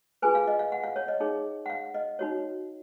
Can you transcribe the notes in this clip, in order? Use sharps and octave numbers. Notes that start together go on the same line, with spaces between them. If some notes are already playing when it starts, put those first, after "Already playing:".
F4 G#4 B4 G#5
F5
D#5
F5
F#5
F5
C#5
D#5
D#4 G#4 C#5
F#5
F5
D#5
D#4 F#4 C#5